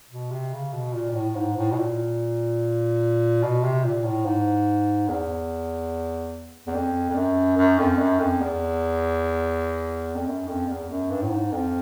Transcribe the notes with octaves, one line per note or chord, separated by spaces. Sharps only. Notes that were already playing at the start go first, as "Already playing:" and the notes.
B2
C3
C#3
B2
A#2
A#2
A2
G#2
A2
B2
A#2
B2
C3
A#2
A2
G#2
E2
E2
F2
F2
F#2
F#2
F2
F#2
F2
E2
F2
F#2
F2
E2
F#2
G2
A2
G#2
F2